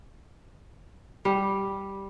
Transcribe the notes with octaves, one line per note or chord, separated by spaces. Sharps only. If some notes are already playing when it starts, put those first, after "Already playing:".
G3